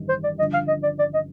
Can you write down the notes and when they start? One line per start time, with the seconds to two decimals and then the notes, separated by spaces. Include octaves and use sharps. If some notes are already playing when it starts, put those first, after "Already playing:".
Already playing: A1 G2 D#3 G3
0.09 C5
0.24 D5
0.38 G1 G2 D3 F3 D#5
0.54 F5
0.68 D#5
0.83 D5
0.99 D5
1.14 D#5